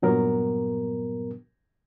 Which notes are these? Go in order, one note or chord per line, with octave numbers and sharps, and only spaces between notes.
G2 A#2 F#3 B3 A#4